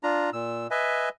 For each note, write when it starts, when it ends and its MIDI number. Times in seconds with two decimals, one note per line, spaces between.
0.03 0.30 62
0.03 0.30 65
0.03 0.30 82
0.33 0.67 46
0.33 0.67 88
0.71 1.09 71
0.71 1.09 75
0.71 1.09 76
0.71 1.09 80